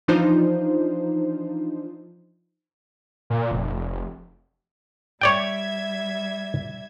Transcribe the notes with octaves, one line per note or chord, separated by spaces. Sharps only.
E3 F3 D4 D#4 F4 C5
A#2
F1
G3 C#5 D5 E5 G5 G#6